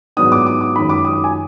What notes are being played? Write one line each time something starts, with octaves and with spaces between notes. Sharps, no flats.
G#2 F#3 B3 D4 D#6
D6
D6
D6
F#2 D#3 G#3 B5
D6
D#6
D6
G#5